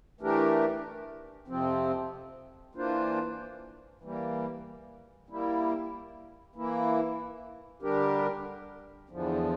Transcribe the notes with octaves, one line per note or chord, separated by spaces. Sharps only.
E3 A3 D4 G4 A#4
F2 C3 F3 C4
E3 A#3 D4 F4 C5
E3 G3 A#3
G3 A#3 E4
E3 A#3 E4
D3 G3 D4 G4 A#4
E2 D3 F3